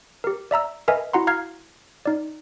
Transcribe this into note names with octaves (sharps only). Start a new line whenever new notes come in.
G4 A#4
D5 E5 A#5 E6
A#4 B4 D#5 E5 G#5
E4 F#4 F#5 A#5 C6
F5 A#5 F6 G#6 C7
D#4 D5